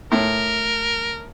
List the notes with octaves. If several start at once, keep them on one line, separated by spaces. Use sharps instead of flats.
A2 A#4